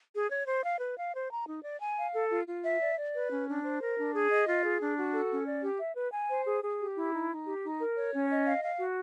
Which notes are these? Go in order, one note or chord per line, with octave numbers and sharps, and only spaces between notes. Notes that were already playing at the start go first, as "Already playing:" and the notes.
G#4
C#5
C5
F5
B4
F5
C5
A#5
D#4
D5
G#5
F5
A4
F4
F4
E5
D5
D5
B4
C#4
D4
C5
A#4
D4
G#4
D#5
F4
G#4
D4
F#4
A4
C#4
D5
G4
E5
B4
G#5
C5
G#4
G#4
G4
E4
D#4
D#4
G4
D#4
A#4
C#5
C#4
D#5
F5
F5
F#4